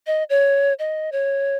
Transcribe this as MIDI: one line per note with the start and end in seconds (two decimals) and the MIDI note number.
0.07 0.24 75
0.30 0.73 73
0.79 1.10 75
1.12 1.57 73